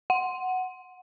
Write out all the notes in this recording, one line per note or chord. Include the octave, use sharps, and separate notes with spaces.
F#5